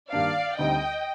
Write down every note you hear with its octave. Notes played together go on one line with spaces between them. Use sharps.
G2 D#3 A#3 D4 D5 F5
D2 D3 G3 C4 D#4 D#5 G5